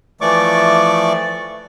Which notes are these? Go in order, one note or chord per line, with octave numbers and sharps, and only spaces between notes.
E3 F3 A3 D5 C#6 D6